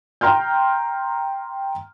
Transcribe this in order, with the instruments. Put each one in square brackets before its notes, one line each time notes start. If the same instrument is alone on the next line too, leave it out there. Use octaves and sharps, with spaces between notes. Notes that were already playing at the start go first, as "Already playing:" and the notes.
[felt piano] G5 A#5 C6 F6 G6